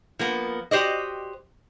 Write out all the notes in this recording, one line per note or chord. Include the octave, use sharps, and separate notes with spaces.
F3 A#3 B3
F#4 G4 C5 D5 D#5